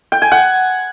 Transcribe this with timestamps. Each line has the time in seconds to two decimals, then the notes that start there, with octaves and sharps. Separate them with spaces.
0.12 G5
0.22 G#5
0.32 F#5